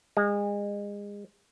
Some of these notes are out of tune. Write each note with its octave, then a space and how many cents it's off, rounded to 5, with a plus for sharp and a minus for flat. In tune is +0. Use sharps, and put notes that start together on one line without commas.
G#3 -30